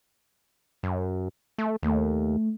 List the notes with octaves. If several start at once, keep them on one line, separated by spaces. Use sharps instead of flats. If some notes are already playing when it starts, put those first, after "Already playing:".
F#2
A3
D#2 A3